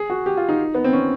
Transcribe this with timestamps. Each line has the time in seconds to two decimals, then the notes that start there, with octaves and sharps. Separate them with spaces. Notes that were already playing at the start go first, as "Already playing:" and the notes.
Already playing: G#4
0.10 F#4
0.26 G4
0.37 F4
0.49 D#4
0.75 B3
0.84 C4
0.93 C#4